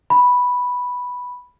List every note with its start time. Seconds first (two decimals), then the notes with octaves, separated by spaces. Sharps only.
0.10 B5